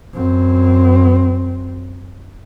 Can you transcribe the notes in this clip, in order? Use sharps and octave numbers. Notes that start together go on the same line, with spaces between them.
F#2 C4